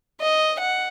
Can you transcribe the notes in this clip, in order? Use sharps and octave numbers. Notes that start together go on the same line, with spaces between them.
D#5
F#5